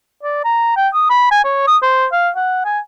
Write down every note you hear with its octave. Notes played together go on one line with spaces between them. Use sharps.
D5
A#5
G5
D#6
B5
G#5
C#5
D#6
C5
F5
F#5
G#5